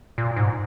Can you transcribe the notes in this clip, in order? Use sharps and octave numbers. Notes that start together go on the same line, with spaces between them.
A#2
G#2